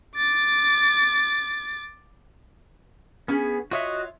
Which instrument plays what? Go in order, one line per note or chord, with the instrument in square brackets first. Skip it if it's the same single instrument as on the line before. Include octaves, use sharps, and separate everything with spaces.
[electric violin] D6 A6
[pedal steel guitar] B3 G#4 [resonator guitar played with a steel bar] C#4
[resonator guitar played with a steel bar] F4 C#5 E5 [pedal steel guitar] F#4 D#5 F#5